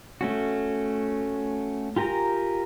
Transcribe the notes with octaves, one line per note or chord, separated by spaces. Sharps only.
A3 C#4 F#4
F4 G4 A#4 G#5 A#5